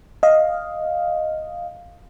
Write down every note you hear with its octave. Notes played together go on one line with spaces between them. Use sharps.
D#5 F5